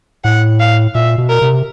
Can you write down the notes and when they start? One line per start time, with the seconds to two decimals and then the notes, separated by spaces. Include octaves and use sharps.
0.24 A2 F#5
0.60 F5
0.94 A#2 E5
1.18 B2
1.29 A#4
1.41 C3